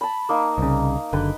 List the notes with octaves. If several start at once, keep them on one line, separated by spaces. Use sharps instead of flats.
A5 B5
A#3 D#4
C2 C#3
F#1 D3 B4 G5